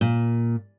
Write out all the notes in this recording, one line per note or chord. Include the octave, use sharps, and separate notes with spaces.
A#2